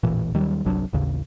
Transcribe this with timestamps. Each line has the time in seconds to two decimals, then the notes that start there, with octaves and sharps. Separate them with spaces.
0.03 E1 A1 A#2 E3
0.34 D#2 D#3 F#3 G3
0.65 G1 C2 F#3 D4
0.93 A1 D#2 C#3